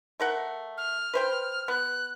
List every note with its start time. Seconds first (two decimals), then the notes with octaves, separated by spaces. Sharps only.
0.20 A3 A#4 F#5
0.77 F6
1.14 B4 C5 G5
1.68 B3 F#6